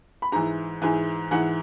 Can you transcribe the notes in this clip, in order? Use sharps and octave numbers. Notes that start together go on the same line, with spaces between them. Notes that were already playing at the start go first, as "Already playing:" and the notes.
B5
G#2 E3 A#5
G#2 E3 G#5
G#2 E3 F#5